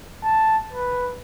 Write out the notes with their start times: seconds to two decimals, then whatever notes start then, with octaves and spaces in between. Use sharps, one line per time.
0.23 A5
0.73 B4